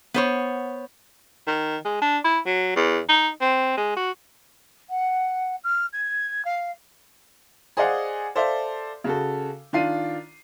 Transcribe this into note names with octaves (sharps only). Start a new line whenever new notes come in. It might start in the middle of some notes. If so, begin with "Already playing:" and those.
B3 C5 C#5
D#3
G#3
D4
E4
F#3
E2
D#4
C4
G#3
F#4
F#5
F6
G#6
F5
G#4 C5 D5 D#5 F5 F#5
A4 C5 D5 E5 F5
C#3 F#4 A4
D#3 D4 F4 C7 D#7